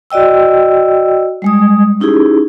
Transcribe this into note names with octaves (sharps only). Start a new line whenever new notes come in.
F#4 D5 D#5 G5 E6
G3 G#3 D#6
C#4 D#4 E4 G4 G#4